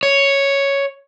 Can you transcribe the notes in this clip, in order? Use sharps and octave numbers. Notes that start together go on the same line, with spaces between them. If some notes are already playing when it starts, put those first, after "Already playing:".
C#5